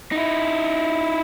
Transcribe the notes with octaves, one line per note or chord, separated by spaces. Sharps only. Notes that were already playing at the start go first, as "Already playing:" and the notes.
D#4 E4